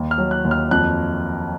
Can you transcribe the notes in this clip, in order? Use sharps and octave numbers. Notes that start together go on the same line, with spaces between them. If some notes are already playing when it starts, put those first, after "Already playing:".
Already playing: D#2
F6
F#3
F#6
D#2
F6
F2 F#6